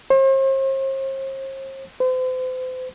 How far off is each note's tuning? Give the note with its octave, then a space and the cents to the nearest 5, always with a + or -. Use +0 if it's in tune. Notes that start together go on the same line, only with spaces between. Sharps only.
C5 +40
C5 -40